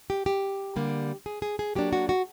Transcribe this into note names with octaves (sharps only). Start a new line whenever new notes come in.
G4
G4
D3 G3 A#3
G#4
G#4
G#4
F#3 A#3 D4 G4
F#4
F#4